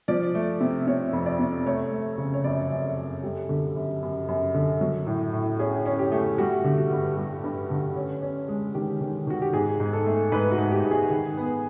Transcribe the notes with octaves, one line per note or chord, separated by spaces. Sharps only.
F3 D5
A3
C3
C3 C#5
F2
D5
C3
A3 C#5
A3
C#3
C#5
F#2 D5
F#2
F#2
G3 A4
D3
F#2
F#2
F#2
D3
F#3
A2
A2
C#4 G#4
C#4
G4
A3
G3 F#4
D3
F#4
G2
G3
G2
D3
C#4
C#4
G#3
D#3 G4
D#3
D#3 F#4
G4
G#2 G#4
G#2
A4
A3
G#2 B4
F#4
G#2
G4
G#2
G#4
D#3
B3